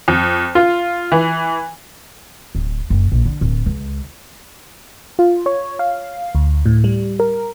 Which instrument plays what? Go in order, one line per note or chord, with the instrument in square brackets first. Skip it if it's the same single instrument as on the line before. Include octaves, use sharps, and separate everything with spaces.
[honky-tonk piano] F2
F4
E3
[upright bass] D1
F#1
A#1
D3
D1
C#2
[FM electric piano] F4
C#5
F5
D2
A2
G3
A#4